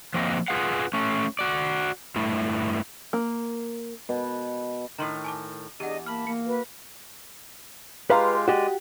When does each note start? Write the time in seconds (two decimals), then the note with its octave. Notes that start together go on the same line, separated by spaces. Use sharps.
0.14 F3 F#3 A#3 C4 D#5
0.48 F4 G#4 B4 F5 F#5
0.93 A3 C#4
1.39 F#4 D5
2.16 G2 A3 E4
3.13 A#3
4.09 B2
4.98 A2 D#3 A#5 C6 C#6
5.24 G#5 A5 D6
5.80 E2 D4 G4 G#4 D#5 F#5
6.06 A#3 A5 B5 F6 F#7
6.27 A#3 C#7
6.46 F#4 B4
8.10 G#3 F4 G4 B4 F5 A#5
8.48 G#3 F#4 G4 D5 D#5